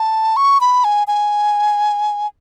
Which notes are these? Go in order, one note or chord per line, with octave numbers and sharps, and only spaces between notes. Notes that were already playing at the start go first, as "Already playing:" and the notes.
Already playing: A5
C#6
B5
G#5
G#5